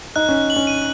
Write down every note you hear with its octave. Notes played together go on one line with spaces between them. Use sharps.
D#4 F#6
C#4 F#6
F#7
C#4
D#7